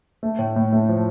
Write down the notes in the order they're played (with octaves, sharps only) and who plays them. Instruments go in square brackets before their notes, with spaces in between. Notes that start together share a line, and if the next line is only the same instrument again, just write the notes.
[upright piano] A3
A2
A2
A3
F3